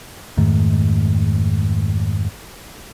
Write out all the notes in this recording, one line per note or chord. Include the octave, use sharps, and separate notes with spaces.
F2 G#2 D#3 A3